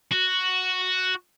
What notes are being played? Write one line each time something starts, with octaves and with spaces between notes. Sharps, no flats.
F#4